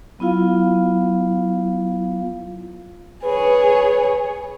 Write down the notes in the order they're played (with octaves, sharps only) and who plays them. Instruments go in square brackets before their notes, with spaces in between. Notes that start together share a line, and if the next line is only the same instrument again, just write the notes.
[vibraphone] F#3 B3 E4 F4 F5
[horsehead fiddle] G#4 C#5 [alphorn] B4